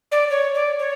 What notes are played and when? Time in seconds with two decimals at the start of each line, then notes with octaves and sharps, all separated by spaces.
0.12 D5
0.31 C#5
0.55 D5
0.79 C#5